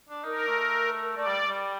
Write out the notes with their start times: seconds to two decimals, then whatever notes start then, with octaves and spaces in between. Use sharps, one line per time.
0.09 D4
0.24 D#4 A#4
0.47 A3
1.16 A3 D5
1.27 G3
1.48 G3